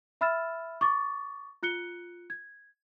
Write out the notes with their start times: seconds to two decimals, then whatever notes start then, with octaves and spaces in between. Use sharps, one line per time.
0.21 E5 B5 E6 F6 A6 E7
0.81 C#6 D6 A6
1.63 F4 F#6 C#7 G7
2.30 G#6